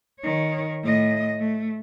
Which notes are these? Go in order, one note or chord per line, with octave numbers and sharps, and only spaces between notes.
D#3 C#5
A2 D#5
A3